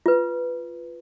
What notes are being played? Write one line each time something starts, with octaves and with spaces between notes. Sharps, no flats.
F4 B4